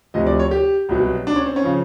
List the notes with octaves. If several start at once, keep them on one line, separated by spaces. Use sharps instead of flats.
D2 C3 F3 D#5
D5
C#5
G4
C2 B2 F#3
D4
C#4
C4
C#4
C#3 F3